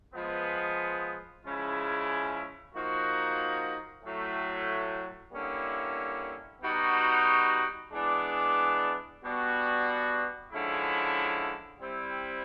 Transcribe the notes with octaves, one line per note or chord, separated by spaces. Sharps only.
F3 G#3 B3
C#3 F3 G#3 C#4 E4
F3 A#3 D#4 F#4
A2 F#3 A3
D3 G3 A#3 C#4 E4
G3 B3 D#4 F#4
E3 G#3 B3 D4
B2 G3 B3 D4 F#4
D3 F3 G#3 C#4 E4
G3 C4 E4